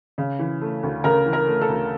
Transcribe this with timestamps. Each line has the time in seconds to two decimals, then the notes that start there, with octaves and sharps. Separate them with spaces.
0.18 C#3
0.39 E3
0.61 A3
0.83 D2
1.04 C#3 A#4
1.26 E3
1.33 A#4
1.48 A3
1.61 A4
1.69 D2